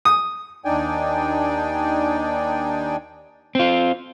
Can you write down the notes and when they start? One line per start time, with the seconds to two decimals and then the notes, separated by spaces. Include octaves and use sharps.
0.05 D#6
0.65 D#2 D4 D#4 D5 G5 G#5
3.55 C4 F4